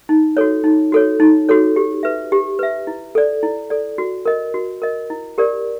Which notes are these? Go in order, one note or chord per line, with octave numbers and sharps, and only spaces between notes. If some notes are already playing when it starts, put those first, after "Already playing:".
D#4
F#4 A4 C#5
D#4
F#4 A4 C#5
D#4
F#4 A4 C#5
G4
B4 E5
G4
B4 E5
E4
A4 D5
E4
A4 D5
F#4
A#4 D#5
F#4
A#4 D#5
E4
G4 A#4 D5